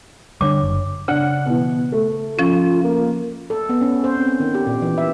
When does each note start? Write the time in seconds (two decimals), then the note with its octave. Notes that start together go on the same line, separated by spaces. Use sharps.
0.41 D3 G3 D4 C#5 D6
0.62 F#1
1.08 C#3 D4 F#5
1.46 B2 E3
1.92 A3
2.39 F3 C#4 F4
2.84 A#3
3.50 A4
3.69 B3
3.81 C#4
4.04 C5
4.17 C4
4.40 D#3
4.55 G4
4.67 A#2
4.82 E3
4.98 E5